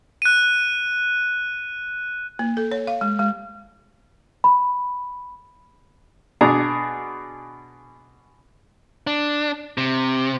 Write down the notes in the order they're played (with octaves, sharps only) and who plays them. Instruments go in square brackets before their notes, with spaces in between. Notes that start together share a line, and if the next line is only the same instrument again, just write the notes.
[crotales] F#6 D#7
[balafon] A#3
A4
C#5
F5
G#3
G#3
[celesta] B5
[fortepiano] B2 D4 G#4 A#5
[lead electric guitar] D4
C3